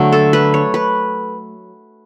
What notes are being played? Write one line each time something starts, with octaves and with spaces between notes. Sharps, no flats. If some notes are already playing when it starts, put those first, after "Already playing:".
Already playing: D3 F#3 A3
A4
B4
C#5
B4